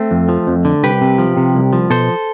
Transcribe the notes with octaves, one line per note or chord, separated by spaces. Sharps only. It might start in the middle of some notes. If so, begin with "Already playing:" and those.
Already playing: A3 C4
F2
F3
F2
D3
C2 G4 B4
C3
F3
C3
C2
F3
B2 A4 C5